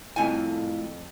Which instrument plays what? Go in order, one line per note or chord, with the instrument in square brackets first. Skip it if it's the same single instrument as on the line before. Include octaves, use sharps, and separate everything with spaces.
[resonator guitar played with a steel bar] F2 G#5 [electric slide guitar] A3 E4 F4